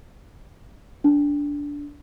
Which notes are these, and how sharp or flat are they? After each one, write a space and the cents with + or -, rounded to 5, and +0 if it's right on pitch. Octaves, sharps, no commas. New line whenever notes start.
D4 -15